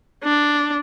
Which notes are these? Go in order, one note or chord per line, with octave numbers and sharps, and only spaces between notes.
D4